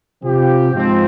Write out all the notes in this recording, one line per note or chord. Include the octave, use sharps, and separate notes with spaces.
C3 F3 C4 G4
G#2 F3 C4